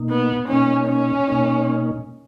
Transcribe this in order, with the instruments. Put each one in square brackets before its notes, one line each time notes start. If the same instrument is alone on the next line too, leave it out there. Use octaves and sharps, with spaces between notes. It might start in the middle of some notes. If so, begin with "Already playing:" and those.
Already playing: [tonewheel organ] B2 A#3 D#4
[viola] B3
[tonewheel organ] B2 A#3 D#4 [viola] C#4
[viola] C#4
[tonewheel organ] B2 A#3 D#4